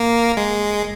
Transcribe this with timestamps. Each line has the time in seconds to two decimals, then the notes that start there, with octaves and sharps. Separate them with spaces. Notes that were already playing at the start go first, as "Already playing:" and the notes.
Already playing: A#3
0.37 G#3